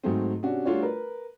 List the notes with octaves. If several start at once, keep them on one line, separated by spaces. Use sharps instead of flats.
G#2 F#3 A3 C4
C3 C#4 D4 F#4
G3 A3 D4 F4 F#4 C#5
A#4 B4